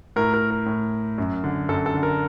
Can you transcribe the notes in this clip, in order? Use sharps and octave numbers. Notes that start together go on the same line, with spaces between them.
A2 A#4
A#4
A#4
A2
F#2
D3
F#2 A4
A4
D3
A#4